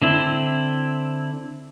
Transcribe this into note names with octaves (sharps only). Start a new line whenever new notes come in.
D3 C4 E4